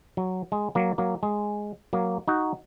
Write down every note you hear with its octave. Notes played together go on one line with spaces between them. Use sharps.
F#3
G#3
F#3 A#3
F#3 A#3
G#3
F#3 A#3
D#4 F#4